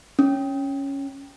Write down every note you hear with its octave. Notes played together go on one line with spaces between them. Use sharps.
C#4